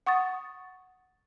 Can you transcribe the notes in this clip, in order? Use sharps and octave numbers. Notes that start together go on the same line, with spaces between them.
F#5 C#6 D#6 A6